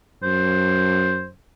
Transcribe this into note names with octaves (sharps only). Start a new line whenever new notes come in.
F#2 C5